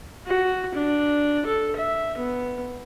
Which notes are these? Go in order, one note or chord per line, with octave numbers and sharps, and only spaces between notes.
F#4
D4
A4
E5
B3